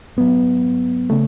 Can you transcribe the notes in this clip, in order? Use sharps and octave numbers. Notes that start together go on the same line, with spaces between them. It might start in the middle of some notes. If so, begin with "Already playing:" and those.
G#2 F#3 B3
C#3 A3